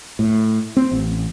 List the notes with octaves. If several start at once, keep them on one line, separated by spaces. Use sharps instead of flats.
A2
C4
A1